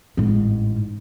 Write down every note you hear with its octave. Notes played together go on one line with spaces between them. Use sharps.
A1 G#2